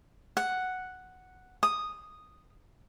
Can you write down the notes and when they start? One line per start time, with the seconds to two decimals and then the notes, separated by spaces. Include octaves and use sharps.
0.37 F#5
1.63 D#6